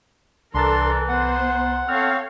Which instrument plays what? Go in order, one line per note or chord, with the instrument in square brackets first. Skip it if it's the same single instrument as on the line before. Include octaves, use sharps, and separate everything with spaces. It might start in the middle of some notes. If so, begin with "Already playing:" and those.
[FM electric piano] C2 A#5 A6 [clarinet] E3 [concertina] D4 C6 [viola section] A4 A#4
[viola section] B3 C5 [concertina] F#5
[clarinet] C4 [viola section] A4 C#5 F5 [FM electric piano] F6